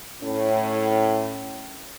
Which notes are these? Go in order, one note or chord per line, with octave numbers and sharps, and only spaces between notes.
A2 C#4